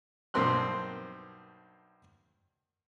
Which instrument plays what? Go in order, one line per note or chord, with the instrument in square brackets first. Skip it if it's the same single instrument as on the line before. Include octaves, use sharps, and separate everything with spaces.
[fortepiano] B1 G2 A#3 C4 C6 F#6